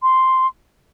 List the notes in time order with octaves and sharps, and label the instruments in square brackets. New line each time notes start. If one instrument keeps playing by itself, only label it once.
[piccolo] C6